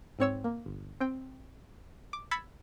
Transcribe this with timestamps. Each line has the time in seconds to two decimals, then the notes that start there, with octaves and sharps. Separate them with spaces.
0.19 G#2 C4 C#5 E6
0.44 A#3
0.66 G1
1.00 C4 G5
2.13 D6
2.31 B5 E6 G#6 A6 B6 C#7